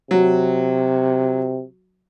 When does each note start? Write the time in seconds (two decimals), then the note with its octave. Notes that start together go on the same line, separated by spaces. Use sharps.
0.11 C3 F#3